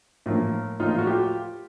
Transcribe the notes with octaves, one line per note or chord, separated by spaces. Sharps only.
A2 F3 A#3
A2 F3 A#3 D#4 F4
F4
F#4
F4 G4